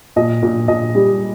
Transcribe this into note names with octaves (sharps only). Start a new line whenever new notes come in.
A#2 D#5
A#2
A#2 D#5
G3